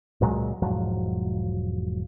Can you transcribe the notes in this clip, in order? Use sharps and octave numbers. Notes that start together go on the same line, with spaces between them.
C#2 A#2 F#3 G#3
E1 G#2 F3 F#3